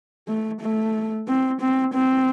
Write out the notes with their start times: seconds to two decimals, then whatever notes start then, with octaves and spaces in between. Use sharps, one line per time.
0.28 A3
0.61 A3
1.28 C4
1.61 C4
1.94 C4